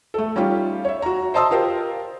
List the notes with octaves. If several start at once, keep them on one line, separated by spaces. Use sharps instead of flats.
A3 A4
G3 C#4 D#4 F4 G4
C#5 E5
F#4 A#5
C5 D#5 A5 C6 D#6 E6
F4 G4 A#4 C5